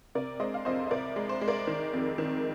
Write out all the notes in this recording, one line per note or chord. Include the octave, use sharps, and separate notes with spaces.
C3 A#4 D5
G#3 C5 D#5
F5
F2 C5 D#5
D#5
C2 A#4 D5
G#3
C5
G#3
A#4 D5
D#3
F2
D#3